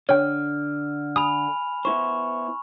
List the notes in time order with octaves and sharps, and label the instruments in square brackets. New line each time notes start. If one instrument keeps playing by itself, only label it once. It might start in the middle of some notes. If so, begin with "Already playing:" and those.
[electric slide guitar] D3 [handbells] C#5 G5 [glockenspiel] F6
[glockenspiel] G#5 B5 F7 [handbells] D#6
[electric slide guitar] B3 E4 C5 [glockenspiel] C#6